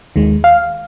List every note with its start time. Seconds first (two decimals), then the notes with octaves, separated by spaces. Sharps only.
0.16 D#2 D#3 G#3
0.44 F5